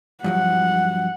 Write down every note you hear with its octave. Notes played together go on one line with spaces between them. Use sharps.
G2 F3 F#3 F#5